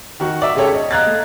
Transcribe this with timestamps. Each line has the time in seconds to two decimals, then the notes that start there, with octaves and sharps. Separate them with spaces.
0.20 D#3 F#4 C#6
0.42 D5 E5
0.55 G#1 C#3 G4 A4 C#5
0.74 D#5
0.91 D#5 F5 A#5 F#6 G#6 A6
1.06 A3